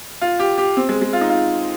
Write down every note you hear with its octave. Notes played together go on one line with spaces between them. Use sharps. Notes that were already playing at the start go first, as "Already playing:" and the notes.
F4
G4
G4
C4
G#3
G#3
F4
D#4
F4